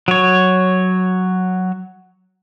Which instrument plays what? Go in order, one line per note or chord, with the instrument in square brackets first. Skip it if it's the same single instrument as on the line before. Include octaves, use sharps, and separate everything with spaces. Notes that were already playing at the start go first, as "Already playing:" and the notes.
[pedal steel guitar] F#3 C#5